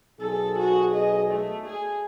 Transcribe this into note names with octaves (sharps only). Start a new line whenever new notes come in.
B1 G#4 A4
F#4
D#5
A3
G#4